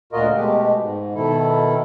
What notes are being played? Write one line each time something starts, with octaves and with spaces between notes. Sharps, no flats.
D2 A#2 F4 F#4 A#4 D#5
B2 G#3 A3 G4
G#2
B2 D#3 E4 A4